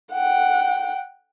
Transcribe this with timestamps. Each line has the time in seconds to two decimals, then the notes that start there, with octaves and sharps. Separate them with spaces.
0.12 F#5 G5